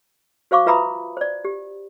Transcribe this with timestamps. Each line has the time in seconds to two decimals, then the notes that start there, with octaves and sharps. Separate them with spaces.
0.51 F#4 C5 F5 C#6 D6
0.66 F4 B4 E5 A#5 B5 D#6
1.17 C5 D5
1.45 G4